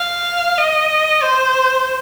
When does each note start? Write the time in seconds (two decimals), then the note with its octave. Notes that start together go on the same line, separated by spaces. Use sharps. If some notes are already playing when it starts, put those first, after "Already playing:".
Already playing: F5
0.58 D#5
1.22 C5